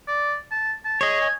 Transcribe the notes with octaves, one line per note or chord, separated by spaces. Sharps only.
D5
A5
A5
G#4 C#5 D#5
G#5